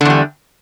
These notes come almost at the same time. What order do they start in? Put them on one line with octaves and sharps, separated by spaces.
D3 E2 G3